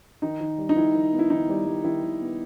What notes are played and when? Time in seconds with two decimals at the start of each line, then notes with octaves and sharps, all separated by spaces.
0.22 D#3 D#4
0.40 D#3
0.58 G3
0.69 D#4
0.77 D#3 E4
0.95 D#3
1.13 B3
1.19 E4
1.30 D#3 D#4
1.49 G3
1.66 G3
1.84 D#3 E4
2.03 D#3
2.21 B3